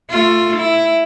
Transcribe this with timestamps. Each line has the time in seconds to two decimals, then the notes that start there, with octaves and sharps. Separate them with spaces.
0.10 A3 F4
0.56 E4